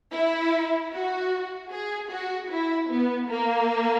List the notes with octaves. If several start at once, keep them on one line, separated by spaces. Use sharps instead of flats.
E4
F#4
G#4
F#4
E4
B3
A#3